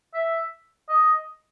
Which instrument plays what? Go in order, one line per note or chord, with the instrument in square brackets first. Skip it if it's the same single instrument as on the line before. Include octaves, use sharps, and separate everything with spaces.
[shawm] E5
D#5